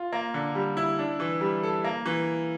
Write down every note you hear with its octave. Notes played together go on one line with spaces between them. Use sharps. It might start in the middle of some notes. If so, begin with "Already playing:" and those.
Already playing: F4
A#3
D3
G3
E4
D4
E3
G3
A4
A#3
E3